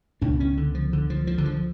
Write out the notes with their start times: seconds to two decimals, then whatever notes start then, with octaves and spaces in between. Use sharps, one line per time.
0.21 C#2 B2 D4
0.40 C#4
0.57 D3
0.75 F3
0.93 D3
1.10 F3
1.27 F3
1.38 D3
1.45 F3